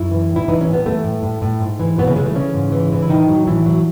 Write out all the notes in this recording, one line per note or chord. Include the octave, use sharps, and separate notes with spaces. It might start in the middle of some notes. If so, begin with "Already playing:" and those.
Already playing: F#2 E4
E3
A2
E4
E3 D#4
C#4
A2
B3
E3 A3
A2
A2
A2
G#2
E3
B2 E3 B3
C#3 C#4
E3 G#3
A3
C#3 E3 C#4
G#2
E3
E3
E4
A2 D#3 D#4
F#3
A2 E3 E4
F#3